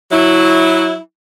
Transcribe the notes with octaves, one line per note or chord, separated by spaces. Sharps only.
F#3 E4